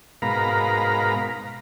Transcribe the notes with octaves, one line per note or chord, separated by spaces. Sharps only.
G#2 B2 A#4 F5 A#5 B5